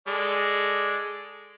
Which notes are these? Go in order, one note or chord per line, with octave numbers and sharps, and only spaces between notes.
G#3 A4 D5